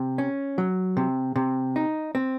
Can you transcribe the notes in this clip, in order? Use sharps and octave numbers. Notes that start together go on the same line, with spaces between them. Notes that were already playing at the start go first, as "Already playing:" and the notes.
Already playing: C3
C#4
F#3
C3
C3
D#4
C4